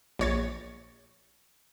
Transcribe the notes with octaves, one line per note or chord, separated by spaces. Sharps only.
A#1 C#5 A6